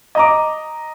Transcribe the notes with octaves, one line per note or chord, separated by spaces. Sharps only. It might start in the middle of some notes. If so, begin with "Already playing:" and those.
D#5 A#5 D6